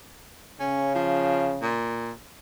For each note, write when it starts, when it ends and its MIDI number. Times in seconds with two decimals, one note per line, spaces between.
0.60 1.78 49
0.60 0.93 61
0.95 1.55 53
1.62 2.12 46